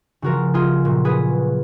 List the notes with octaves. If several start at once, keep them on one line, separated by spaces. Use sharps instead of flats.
C#3 F3 F#4 A#4
F4 G#4
A#2 F#3
G#4 B4